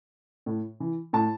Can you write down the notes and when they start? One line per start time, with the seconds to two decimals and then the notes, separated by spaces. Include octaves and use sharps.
0.46 A2
0.80 E3
1.13 A2 A5